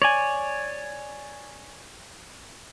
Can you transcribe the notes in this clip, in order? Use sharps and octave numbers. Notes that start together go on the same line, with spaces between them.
C#5 D5 G#5